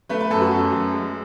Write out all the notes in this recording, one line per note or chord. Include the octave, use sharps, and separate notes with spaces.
A3 B4
B4
F#2 A4
F#4
F#2
F#2
G#3